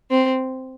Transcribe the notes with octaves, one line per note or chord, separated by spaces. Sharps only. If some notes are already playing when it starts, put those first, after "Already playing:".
C4